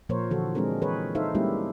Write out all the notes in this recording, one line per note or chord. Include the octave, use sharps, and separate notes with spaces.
A#2 F3 A#3 A#4 C5 C#5
D3 E3 F3 F#4 A4
G#3 C4 D4 G#4 A#4
E3 G#4 A#4 B4 C#5
D#4 A4 C5 E5 F5
G3 G#3 A#3 C#4 E4 G4